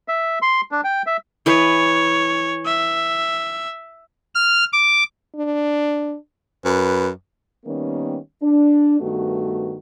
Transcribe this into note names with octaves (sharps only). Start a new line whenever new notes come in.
E5
C6
D4
G5
E5
E3 B4 C#5 D#5
E5
F6
D6
D4
F#2 B4
D#3 G3 A#3 B3 C#4
D4
G2 D#3 A3 B3 F#4